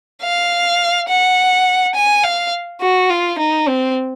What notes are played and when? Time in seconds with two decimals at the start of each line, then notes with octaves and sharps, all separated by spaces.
0.23 F5
1.09 F#5
1.95 G#5
2.24 F5
2.81 F#4
3.10 F4
3.39 D#4
3.67 C4